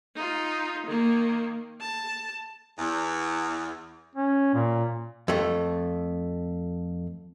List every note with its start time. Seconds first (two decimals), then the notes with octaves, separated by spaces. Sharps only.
0.15 D#4 F4
0.86 D#3 A#3
1.81 A5
2.79 E2
4.16 C#4
4.54 A#2
5.28 F2 A3